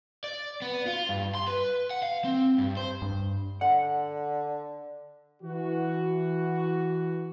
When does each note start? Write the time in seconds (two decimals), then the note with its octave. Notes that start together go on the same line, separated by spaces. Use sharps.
0.24 D5
0.62 B3
0.87 F4
1.09 G2
1.35 C6
1.48 B4
1.91 F#5
2.02 F5
2.24 C4
2.58 G2
2.77 C5
3.02 G2
3.61 D3 F#5
5.43 E3 F#4